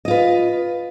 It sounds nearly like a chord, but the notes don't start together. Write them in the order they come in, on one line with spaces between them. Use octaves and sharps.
D#5 F4 B4